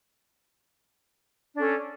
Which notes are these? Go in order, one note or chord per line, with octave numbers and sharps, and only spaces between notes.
C#4 D4 A4